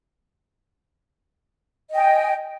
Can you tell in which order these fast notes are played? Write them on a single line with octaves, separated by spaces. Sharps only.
D#5 G5 G#5